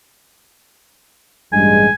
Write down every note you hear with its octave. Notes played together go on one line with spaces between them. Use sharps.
A1 G2 G#3 G#5